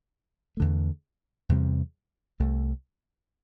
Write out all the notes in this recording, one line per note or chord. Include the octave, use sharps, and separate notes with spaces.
E2 D3 A3
E2 C3 G3 C4
C2 C3 A3